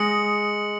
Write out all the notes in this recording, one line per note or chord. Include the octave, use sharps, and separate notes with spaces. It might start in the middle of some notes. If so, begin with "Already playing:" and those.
Already playing: G#3 D#6 A#6 C#7 F#7